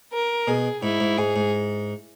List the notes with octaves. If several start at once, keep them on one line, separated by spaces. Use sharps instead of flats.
A#4
B2 G#4
G#2 E4
G#2
G#2 G#4
G#2